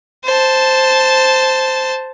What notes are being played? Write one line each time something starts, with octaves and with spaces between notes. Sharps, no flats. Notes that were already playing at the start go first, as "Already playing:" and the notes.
C5 A5